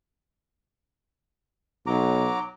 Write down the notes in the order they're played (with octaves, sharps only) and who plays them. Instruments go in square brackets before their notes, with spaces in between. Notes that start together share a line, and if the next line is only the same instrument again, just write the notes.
[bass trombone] B1 [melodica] F#3 A#5 D6